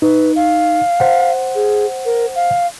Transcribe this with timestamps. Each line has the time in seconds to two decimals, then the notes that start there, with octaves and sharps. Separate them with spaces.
0.02 D#4 B4
0.36 F5
1.00 C5 F#5
1.55 G#4
2.05 A#4
2.35 F5